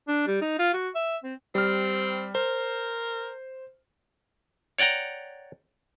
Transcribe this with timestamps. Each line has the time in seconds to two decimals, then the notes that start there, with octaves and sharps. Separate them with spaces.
0.08 D4
0.27 G3
0.41 D#4
0.59 F4
0.73 F#4
0.95 E5
1.24 C4
1.55 G3 C4 F6
2.35 A#4 C5
4.78 C#5 D5 F#5 G5 A#5